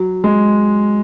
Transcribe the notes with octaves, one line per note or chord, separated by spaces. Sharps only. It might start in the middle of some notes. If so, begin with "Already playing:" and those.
Already playing: F#3
G#3